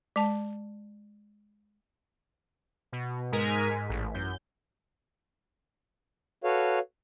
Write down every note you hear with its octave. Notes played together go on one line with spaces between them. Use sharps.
G#3 A5
B2
G#2 G#3 A#4 G#5 B6
G#2
A1
F#2 G6
F#4 A4 B4 C#5 F5